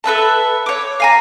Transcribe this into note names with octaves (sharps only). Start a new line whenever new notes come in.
A4 B4 E5 A5
C#5 D6
F5 G#5 A#5